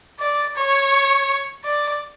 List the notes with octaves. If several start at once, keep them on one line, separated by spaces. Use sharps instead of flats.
D5
C#5
D5